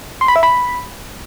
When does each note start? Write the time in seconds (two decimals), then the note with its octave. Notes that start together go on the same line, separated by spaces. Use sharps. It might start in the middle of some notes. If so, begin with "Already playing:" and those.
0.21 C6
0.28 B5
0.36 E5
0.43 B5